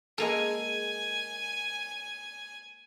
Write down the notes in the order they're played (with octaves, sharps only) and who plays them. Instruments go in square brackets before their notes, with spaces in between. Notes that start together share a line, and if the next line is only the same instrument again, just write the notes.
[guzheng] G#3 A#3 A4 [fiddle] G#5